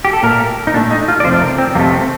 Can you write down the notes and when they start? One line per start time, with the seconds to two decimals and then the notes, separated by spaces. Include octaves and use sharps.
0.05 G4
0.13 A4
0.23 A#2 A3 A#4
0.67 D#4
0.74 A#2 D4
0.77 A3
0.91 D#4
1.08 F4
1.20 D5
1.24 F2 C3 F3 A3 C5
1.41 A#4
1.58 C4
1.75 F2 C3 F3 A3 A#3
1.92 C4